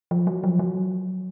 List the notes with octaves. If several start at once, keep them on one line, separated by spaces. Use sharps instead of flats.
F3
F#3
F3
F#3